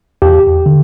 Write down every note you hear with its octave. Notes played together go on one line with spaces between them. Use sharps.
E2 G4
D3